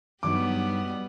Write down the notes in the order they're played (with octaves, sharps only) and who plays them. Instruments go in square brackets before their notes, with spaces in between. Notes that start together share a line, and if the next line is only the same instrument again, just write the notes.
[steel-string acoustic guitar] G2 F#3 D#4 [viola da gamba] G3 B3 [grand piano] D6